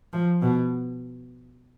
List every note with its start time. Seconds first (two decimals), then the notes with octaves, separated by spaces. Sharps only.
0.13 F3
0.42 B2